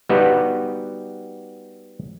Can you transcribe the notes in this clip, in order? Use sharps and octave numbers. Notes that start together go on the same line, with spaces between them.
G3 B3 D#4 F#4 B4